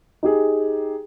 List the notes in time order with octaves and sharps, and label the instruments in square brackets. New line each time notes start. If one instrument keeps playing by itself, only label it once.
[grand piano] D#4 G4 G#4